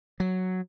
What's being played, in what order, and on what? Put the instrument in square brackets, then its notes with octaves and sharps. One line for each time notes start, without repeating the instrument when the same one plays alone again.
[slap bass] F#3